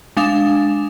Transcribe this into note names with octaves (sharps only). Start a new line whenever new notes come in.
G#3 D4 F5 E7